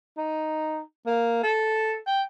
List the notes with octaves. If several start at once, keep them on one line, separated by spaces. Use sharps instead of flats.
D#4
A#3
A4
G5